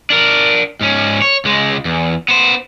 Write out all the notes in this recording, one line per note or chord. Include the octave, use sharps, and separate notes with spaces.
D4 A#4
G#2 C#4
C#5
C#2 G#3
E2
B3 C5